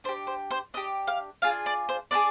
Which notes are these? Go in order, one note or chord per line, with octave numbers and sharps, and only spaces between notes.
D4 G4 C5
C5
C5
D4 G4 D#5
F5
D4 F4 G#4 F5
D5
C5
D4 F4 G#4 D5